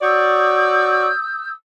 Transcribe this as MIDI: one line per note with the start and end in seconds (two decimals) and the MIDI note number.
0.01 1.09 66
0.01 1.09 73
0.01 1.09 74
0.01 1.50 87
0.01 1.50 88
0.01 1.50 91